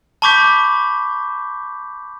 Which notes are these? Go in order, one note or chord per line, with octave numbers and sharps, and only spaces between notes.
A5 B5 C#6 D6 G6 B6